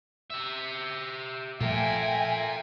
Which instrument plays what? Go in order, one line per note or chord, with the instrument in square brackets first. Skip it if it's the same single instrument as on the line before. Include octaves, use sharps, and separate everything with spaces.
[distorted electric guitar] G4 E5
[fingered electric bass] A#2 F3 [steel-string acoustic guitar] A3 [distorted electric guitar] F4 A#4 [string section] E5 G5 G#5